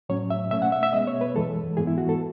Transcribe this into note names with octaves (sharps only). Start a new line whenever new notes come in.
A2 F#3 C#4 C#5
E5
B2 A3 C#4 E5
F#5
E5
E5
B2 G#3 B3 D#5
C#5
B4
F#2 E3 G#3 A4
G#2 E3 G#3 B3 G#4
E4
F#4
A4